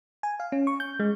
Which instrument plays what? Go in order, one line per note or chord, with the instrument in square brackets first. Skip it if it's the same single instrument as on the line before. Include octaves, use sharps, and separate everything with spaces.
[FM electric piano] G#5
F5
C#4
C#6
G6
G#3